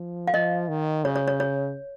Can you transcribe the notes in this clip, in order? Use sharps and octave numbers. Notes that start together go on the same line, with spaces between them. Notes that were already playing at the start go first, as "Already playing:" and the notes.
Already playing: F3
F5
F3 D#5
D#3
C#3 C#5
C#5
C#5
C#5